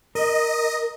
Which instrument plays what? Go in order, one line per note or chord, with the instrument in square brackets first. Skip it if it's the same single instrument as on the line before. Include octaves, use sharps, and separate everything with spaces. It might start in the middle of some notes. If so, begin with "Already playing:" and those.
[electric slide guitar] A#4 [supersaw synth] D#5